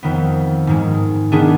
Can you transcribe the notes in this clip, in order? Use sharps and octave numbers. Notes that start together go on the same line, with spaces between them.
F2 D#3 B3
G#2 D#3 G#3
D#3 B3 D4 G#4